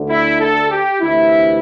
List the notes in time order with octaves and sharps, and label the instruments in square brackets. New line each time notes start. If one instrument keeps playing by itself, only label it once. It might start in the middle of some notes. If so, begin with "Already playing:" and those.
Already playing: [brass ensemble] D2 D3
E4
A4
G4
D2 C3 E3 E4